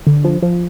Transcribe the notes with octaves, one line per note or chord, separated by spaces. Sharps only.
D3
F3
F3